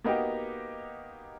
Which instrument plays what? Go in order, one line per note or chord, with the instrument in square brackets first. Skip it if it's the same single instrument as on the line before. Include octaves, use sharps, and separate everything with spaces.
[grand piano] A#3 B3 D#4 F#4 G4